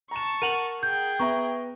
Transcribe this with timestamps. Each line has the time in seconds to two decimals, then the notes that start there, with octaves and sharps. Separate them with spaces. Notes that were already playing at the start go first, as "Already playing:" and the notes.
0.11 A5 A#5 C#6 E7
0.42 A#4 F#5 D#7 F7 F#7
0.83 G#4 G5 G6
1.19 B3 E5 A#5 C#6